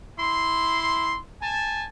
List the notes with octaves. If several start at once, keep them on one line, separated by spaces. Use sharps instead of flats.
E4 C6
G#5 A5